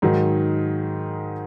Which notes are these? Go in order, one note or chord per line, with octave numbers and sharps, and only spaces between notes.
G#2 D#3 F#3